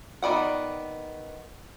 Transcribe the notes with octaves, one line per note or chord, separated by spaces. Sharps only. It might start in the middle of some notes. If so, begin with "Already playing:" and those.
D#3 B3 D5 F#5